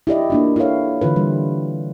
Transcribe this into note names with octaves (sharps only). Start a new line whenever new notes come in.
E4 G4 D5 D#5
A#3 D4 F4
E4 G4 A4 B4 C#5 F5
D3 E3 F4 B4
G3